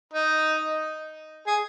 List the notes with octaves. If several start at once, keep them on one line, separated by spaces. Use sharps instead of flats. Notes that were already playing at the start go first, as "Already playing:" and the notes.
D#4
G#4